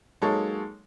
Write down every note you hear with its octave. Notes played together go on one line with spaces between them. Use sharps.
F#3 G#3 A#3 D#4 A4 C#5